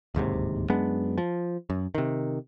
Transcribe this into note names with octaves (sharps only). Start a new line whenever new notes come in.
D1 D#2 G#2 C3
F#2 G#3 B3 D4
F3
F#2
C3 D#3